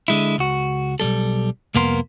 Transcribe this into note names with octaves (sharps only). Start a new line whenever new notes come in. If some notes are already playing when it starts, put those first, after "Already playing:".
D3 G#3 E4
C#2 F#4
B1 F#2 G3 A4
C2 F2 A#3 B3 A#4 C6